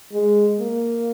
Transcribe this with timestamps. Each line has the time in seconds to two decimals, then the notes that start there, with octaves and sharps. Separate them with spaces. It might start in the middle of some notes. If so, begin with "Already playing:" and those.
0.13 G#3
0.60 A#3